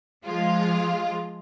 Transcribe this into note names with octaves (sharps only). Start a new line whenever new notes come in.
F3 G#3 F4